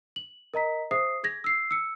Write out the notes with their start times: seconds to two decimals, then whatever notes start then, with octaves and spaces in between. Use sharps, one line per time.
0.16 F#7
0.54 A#4 D#5 A#5 B6
0.91 G#4 C5 E5 D#6 C7
1.23 G#4 G#6 A#6
1.44 E6 C7
1.71 E6 C#7